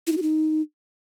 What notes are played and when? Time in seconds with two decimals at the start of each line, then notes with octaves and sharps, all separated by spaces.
0.07 E4
0.12 D#4
0.17 F#4
0.22 D#4